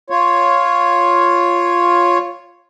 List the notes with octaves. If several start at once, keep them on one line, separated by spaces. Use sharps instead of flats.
F4 C#5